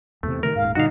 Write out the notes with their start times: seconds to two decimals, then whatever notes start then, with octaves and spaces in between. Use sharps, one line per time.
0.23 E2 C3 A3
0.43 C3 D#3 A3 A#4
0.56 D#1 G#2 F5
0.75 G2 A#2 D3 D#4 F#4 F5